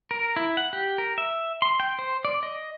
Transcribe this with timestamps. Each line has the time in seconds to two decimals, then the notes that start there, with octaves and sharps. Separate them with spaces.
0.11 A#4
0.36 E4
0.57 F#5
0.73 G4
0.98 A#4
1.18 E5
1.62 C6
1.80 G5
1.99 C5
2.25 D5
2.43 D#5